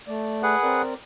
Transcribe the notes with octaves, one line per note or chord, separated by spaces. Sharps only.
A3 D5
G#4 B4 F#5
C4 A#4 D5